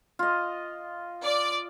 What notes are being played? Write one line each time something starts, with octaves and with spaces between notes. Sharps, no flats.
F4 D#5
D5